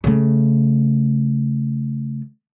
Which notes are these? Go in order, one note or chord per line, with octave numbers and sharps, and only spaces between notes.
C#3 A3